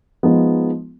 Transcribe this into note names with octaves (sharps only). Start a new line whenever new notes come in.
F3 G#3 B3 D#4